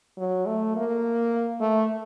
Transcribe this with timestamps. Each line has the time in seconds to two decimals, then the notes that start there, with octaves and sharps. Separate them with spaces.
0.18 F#3
0.46 A3
0.76 A#3
1.60 A3